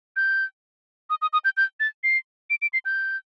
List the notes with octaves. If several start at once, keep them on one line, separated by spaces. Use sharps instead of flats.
G6
D#6
D#6
D#6
G6
G6
A6
C7
D7
D7
C7
G6